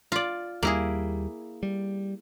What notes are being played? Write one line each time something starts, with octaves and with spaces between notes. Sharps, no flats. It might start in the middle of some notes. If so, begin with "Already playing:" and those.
F4 D5
D#2 G3 A#3 E4 G#4
G3